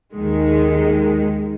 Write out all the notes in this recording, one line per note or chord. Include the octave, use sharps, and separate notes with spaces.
D#2 D#3 G#3